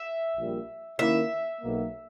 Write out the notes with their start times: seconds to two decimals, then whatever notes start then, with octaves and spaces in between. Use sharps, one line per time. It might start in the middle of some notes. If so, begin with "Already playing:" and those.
Already playing: E5
0.36 A#1 A#2 G3
0.99 D#3 A#3 C#4 E4 E5
1.61 B1 B2 A#3